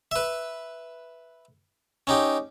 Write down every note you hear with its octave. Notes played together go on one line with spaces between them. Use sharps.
B4 E5
C#4 D#4 G4